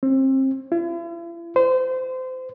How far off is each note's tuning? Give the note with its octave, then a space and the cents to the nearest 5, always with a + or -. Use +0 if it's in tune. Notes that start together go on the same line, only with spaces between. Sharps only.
C4 +30
E4 +45
C5 -30